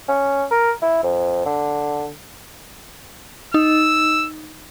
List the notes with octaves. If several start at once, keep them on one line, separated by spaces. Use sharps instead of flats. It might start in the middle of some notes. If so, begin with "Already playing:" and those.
C#4
A#4
E4
F2
D3
D#4 E6